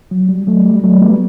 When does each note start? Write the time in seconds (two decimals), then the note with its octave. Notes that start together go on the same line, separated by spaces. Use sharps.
0.11 F#3
0.29 G3
0.47 F#3 A3
0.65 G3
0.84 F#3 A3
1.02 G3 B3